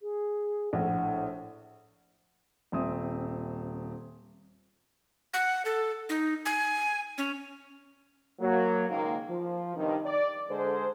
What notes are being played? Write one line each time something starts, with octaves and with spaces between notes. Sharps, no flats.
G#4
A#1 A2 F#5
D#1 C4 E5 D#6
F#5
A4
D#4
G#5
C#4
F#3 A#3
C#2 G#2 D#3 A#3
F3
G2 C3 D#3 D#4
D5
D3 G#3 C5